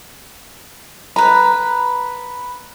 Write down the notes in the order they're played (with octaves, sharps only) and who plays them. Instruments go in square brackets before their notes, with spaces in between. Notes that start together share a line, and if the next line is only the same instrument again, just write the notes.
[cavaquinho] B4 B5 [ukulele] A#5